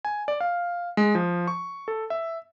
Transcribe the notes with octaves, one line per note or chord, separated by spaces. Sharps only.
G#5
D5
F5
G#3
F3
C#6
A4
E5